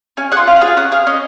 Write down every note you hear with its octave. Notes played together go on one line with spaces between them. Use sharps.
C#4 G#5
G#4 F#5
F4
C#4 F5
F#5
F4 G#4
F5
C#4 F#5
G#4 F5
C#4 D#5